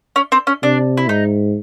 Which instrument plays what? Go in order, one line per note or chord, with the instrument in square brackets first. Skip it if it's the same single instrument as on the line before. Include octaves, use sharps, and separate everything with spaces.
[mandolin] C#4
C4
C#4
[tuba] C3 [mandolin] D4
[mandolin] E4
[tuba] G#2 [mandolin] D#4